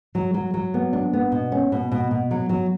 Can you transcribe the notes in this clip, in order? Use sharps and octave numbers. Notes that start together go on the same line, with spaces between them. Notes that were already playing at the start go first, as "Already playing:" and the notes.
F#3
F#3
F#3
B3
D4
B3
B2
C#4
B2
B2
B2
F#3
F#3